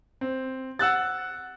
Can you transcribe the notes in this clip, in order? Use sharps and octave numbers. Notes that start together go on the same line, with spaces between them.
C4
F#5 E6 F#6 A6